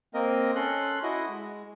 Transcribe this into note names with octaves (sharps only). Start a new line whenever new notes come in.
A#3 C4 A#4 D#5
C#4 A4 C6 F#6
E4 F#4 D#5
G#3